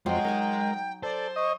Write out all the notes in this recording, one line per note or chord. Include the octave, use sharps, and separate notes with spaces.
F2 F#3 G#3 C5 D#5 G5
D#4 A#4 G#5
A4 C5 D5
D#5 C#6